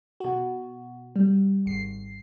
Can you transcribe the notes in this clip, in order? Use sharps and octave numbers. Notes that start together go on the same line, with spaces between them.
B2 F#4
G3
G#1 C7